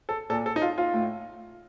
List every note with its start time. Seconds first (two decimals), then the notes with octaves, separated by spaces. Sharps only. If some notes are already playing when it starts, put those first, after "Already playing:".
0.09 A4
0.30 A#2 A4
0.46 A4
0.56 D#4
0.62 F4
0.78 F4
0.94 A2